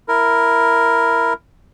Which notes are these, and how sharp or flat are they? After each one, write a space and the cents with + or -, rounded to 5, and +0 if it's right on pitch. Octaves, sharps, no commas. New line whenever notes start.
E4 +0 A#4 +0